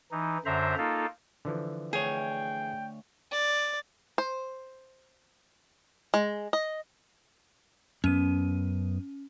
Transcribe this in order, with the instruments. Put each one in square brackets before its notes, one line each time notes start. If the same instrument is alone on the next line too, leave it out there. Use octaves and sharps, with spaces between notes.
[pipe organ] E3 D#4
F#2 D3 C5 E5 A#5
A#3 D#4 F4 A4
[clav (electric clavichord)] D3 E3 F3
[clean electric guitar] D2 C#5 [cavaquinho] G#4 [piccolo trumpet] G5
[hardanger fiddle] D5
[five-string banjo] C5
G#3
D#5
[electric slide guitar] F#2 B3 [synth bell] C#4 D#7